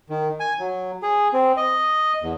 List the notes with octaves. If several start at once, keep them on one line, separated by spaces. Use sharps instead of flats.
D#3
G#5
F#3
G#4
C4
D#5
E2